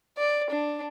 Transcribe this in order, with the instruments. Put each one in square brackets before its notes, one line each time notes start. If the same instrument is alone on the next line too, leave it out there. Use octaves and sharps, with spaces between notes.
[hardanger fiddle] D5
D4